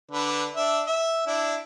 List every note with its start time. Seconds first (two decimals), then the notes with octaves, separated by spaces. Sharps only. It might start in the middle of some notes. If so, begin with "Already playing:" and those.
0.11 D3 D4 B4
0.56 D4 E5
0.87 E5
1.27 D4 E4